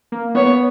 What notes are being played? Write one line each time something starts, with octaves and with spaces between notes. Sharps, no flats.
A#3
B3 C#5